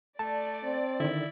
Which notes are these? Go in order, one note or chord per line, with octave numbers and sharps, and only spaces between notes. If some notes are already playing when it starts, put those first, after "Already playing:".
A3 D5 A5
C4
D3 D#3 E4